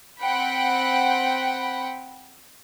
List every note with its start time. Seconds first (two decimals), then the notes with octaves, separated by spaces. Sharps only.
0.20 C4 F#5 G5 B5